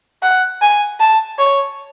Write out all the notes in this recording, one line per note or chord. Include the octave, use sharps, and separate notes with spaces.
F#5
G#5
A5
C#5